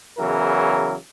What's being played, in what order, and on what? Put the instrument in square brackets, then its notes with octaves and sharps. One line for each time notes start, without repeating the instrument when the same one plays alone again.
[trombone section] E2 C#3 E3 F#3 A#4